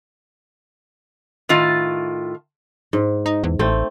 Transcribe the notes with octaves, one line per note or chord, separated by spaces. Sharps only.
A2 D#3 F4
G#2
D#4
E2
A1 A3 C4